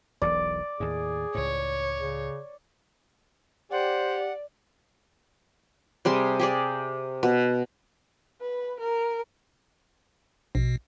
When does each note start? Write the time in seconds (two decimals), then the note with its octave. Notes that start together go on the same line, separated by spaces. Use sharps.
0.22 E1 B1 E3 D5
0.80 D#2 A2 G#4
1.35 C#2 A2 C#5
1.98 C#3
3.71 G4 C5 D5 F#5
6.05 C3 G3 G#4 C6
6.40 G4 G#4 D5
7.23 B2
8.41 B4
8.80 A#4
10.55 A#1 B2